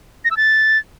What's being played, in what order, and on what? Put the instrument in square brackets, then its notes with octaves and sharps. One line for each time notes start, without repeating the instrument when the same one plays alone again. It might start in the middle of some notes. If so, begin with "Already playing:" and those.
[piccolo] A#6
E6
A6